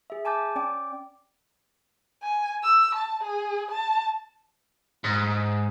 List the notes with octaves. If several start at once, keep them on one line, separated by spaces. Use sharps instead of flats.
G#4 E5
G#5 A5 D6 G6 A6
C#4 D5 G5 D6
G#5
E6
A5
G#4
A5
G#2